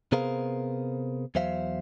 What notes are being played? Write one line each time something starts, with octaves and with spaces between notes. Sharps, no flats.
C3 B3 G#4 A#4 C5 F5
E2 F#3 C5 E5 F5